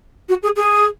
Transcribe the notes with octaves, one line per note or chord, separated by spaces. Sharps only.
F#4
G#4
G#4